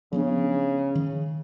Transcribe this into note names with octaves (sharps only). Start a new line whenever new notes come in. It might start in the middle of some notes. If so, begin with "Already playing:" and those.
C#3 F3 B3 D4
D#3